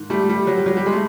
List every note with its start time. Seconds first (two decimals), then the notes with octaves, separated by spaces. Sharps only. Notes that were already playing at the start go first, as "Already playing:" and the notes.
Already playing: G#2 D#3
0.10 G3 A3
0.29 G3
0.47 F#3
0.57 G3
0.66 F#3
0.77 G3
0.86 G#3
0.93 A3